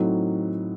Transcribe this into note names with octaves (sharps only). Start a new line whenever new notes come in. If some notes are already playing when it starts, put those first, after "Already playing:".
Already playing: A2 F#3 C4 D#4 A4